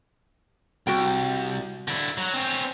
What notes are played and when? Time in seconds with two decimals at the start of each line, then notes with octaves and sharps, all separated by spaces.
0.87 C2 F#4 G5
1.88 D3 E4
2.18 F#3
2.34 C4 C#4